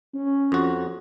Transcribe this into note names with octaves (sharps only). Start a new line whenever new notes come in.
C#4
F2 F#4